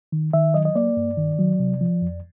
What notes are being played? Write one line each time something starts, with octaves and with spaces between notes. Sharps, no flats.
D#3
D#3 E5
F#3 D#5
D#5
A#3 D5
G2
D#3
F#3
C3
F3
F2